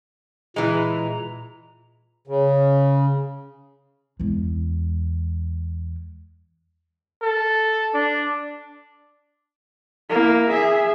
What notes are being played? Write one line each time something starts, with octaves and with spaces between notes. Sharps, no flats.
A#2 E3 G#3 A#5
C#3
E2 G#3
A4
D4
A#3 E4
G#4 E5